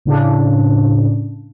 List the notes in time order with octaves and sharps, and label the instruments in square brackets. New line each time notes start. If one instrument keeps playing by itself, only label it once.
[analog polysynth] A2 C#3 D4